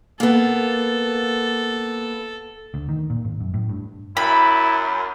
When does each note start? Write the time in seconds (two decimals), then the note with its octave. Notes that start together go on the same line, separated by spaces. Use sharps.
0.20 A#3 B3 A4
2.74 D2
2.89 D#3
3.10 A#2
3.25 G#1
3.41 F#2
3.54 A2
3.69 G2
4.17 F#2 E4 B5